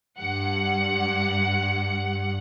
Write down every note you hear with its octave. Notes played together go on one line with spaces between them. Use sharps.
G2 F#5